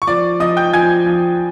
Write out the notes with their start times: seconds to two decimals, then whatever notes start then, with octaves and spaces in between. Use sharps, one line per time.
0.02 C#6
0.07 F3 D5 D6
0.40 F3 D#5 D#6
0.57 G5 G6
0.73 F3 G#5 G#6
1.06 F3